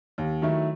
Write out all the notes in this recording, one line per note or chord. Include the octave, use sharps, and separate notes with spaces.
D#2
D#3 F#3 A3 E4